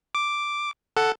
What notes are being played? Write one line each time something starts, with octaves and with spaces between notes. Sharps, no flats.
D6
A4 F#5